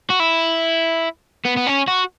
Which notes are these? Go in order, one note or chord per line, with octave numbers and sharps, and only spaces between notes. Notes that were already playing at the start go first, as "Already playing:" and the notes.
F#4
E4
B3
B3
C#4
F#4